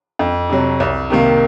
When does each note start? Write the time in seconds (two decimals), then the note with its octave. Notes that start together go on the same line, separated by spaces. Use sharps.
0.19 F2
0.50 C3 F#3
0.80 C2
1.10 C3 D#3 A#3